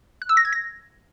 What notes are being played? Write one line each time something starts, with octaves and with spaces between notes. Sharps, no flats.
F#6
E6
A#6
G#6
A#6